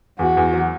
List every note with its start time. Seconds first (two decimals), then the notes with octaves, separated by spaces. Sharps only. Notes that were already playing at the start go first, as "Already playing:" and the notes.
0.19 E2 F#4
0.37 E2
0.54 F#3